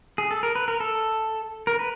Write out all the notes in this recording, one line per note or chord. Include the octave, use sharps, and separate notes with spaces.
G#4
A4
A#4
B4
A#4
A4
A#4
B4